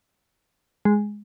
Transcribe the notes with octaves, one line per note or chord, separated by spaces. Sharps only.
G#3